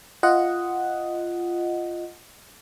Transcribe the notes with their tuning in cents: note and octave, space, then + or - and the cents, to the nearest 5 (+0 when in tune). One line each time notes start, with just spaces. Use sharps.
F4 -10 D#5 +0 F#5 +0